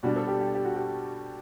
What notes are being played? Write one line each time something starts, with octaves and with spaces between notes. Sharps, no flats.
B2 G3 D4 F#4
A4
G4
G4
G4
F#4
G4